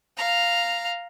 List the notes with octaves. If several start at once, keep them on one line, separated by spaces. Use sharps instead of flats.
F5 A#5